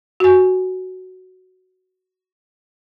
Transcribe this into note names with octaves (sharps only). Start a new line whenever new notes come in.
F#4 G#5